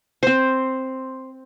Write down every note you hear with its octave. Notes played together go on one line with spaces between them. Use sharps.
C4 C5